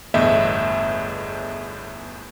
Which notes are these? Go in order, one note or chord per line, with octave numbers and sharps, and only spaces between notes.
G1 E2 A2 D#5 E5